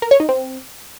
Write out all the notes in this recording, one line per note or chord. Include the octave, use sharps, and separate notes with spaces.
A#4
C#5
D#4
C4